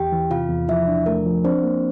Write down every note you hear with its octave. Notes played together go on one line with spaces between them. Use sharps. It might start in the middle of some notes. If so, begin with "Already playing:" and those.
Already playing: E2 G4 G5
E3
C3 F4 F5
E2
F3 E4 E5
D4
A3 A#4
F3
C4 D4 C5
A#3